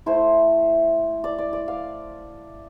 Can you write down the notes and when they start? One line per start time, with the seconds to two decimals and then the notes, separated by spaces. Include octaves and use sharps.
0.06 A3 E4 C5
1.24 D5
1.38 D5
1.53 D5
1.68 F5